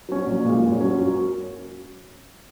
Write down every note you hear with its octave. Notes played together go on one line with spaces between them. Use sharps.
F#3 C#4
A#1
A#2 G#3
F#2
F#3 C#4
F#2